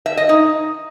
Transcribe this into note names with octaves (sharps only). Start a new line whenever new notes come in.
E5
D#5
D#4